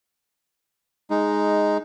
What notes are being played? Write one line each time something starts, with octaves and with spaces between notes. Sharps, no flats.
G#3 D#4